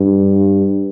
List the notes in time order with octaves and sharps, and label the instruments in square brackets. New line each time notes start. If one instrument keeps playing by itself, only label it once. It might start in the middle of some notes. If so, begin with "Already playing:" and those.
Already playing: [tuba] G2